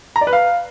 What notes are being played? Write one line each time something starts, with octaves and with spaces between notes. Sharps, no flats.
A#5
D5
B4
F5